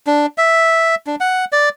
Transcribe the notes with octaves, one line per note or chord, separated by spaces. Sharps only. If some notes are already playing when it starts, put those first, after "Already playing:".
D4
E5
D4
F#5
D5